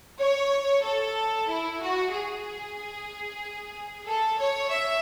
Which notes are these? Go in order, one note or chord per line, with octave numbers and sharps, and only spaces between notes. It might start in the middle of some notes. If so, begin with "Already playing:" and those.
C#5
A4
E4
F#4
G#4
A4
C#5
E5